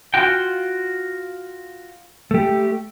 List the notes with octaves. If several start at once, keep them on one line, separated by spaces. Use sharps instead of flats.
F4 F#4 G5
A3 G4